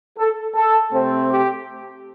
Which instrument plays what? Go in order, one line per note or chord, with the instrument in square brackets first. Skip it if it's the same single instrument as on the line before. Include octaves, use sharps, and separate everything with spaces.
[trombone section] A4
A4
C3 A3 C4
G4